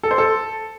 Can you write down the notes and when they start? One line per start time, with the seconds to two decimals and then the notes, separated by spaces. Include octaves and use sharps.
0.03 A4
0.11 C5
0.18 A4